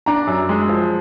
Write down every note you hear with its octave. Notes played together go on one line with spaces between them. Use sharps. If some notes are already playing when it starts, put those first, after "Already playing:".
D4 A#5
F#2
G#3
F3